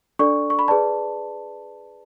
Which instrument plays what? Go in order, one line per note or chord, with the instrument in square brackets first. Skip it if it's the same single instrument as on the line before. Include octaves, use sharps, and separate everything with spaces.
[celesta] D4 A4 D5 C#6
C#6
B5
G#4 B4 D5 A5